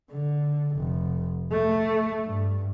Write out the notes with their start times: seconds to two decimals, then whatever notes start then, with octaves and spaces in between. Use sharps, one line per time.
0.11 D3
0.77 F1
1.51 A3
2.24 G2